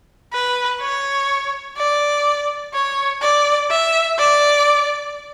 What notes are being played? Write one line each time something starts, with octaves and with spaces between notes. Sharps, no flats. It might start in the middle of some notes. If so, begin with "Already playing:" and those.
B4
C#5
D5
C#5
D5
E5
D5